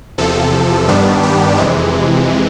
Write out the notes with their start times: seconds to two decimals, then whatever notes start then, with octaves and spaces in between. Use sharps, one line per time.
0.18 E2 C3 F3 A4
0.88 G2 D#3 G3 B3 D4
1.23 G4
1.57 F2 C3 E3 G#3